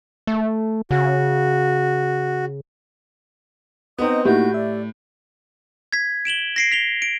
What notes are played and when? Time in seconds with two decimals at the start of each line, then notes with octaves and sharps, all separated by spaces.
0.27 A3
0.91 C#3 F#4
3.98 B3 C4 D#4 D#5 D#6
4.25 A2 A#3 D#4 E4 F#4 G4 G6
4.54 D5 E5
5.93 G#6 B6
6.25 D7 E7 F#7 G7
6.56 A#6 C7 D7
6.72 B6 F7 G7
7.02 D7